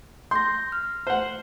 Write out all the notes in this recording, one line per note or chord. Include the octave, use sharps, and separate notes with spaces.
C6 G6 A#6
F6
C5 F#5